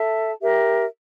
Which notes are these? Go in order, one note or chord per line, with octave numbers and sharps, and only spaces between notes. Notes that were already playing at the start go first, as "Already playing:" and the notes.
Already playing: A4 E5 A5
G4 A#4 E5